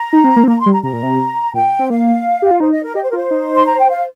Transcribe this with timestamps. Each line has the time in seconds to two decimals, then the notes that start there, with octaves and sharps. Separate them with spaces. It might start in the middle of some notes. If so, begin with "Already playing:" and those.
Already playing: A#5
0.13 D#4
0.24 C4
0.36 A#3
0.43 C4
0.48 A#3 A#5
0.60 C6
0.66 G3
0.72 A#5
0.83 C3 A#5
0.93 A#2
1.03 C3
1.54 A#2 G5
1.79 C4
1.90 A#3 F5
2.42 G4
2.51 F4
2.60 D#4 C5
2.71 D#5
2.83 A#4
2.95 G4 D#5
3.03 C5
3.10 F4 A#4
3.17 C5
3.31 D#4
3.56 C6
3.66 A#5
3.79 G5
3.89 F5